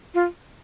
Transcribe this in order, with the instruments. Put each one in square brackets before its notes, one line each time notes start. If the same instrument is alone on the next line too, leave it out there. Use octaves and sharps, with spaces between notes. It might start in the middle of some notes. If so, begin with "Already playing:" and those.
[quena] F4